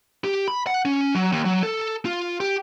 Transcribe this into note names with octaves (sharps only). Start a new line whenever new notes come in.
G4
B5
F#5
C#4
F#3
D#2
F#3
A4
F4
G4